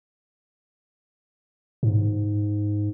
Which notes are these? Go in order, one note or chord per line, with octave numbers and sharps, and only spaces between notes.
G#2